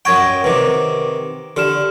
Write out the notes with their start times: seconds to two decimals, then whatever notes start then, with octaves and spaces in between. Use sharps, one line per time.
0.05 F#2 D#5 F#5 G5 C#6 G#6
0.44 C3 D#3 B4 D6
1.57 D3 G4 F6 E7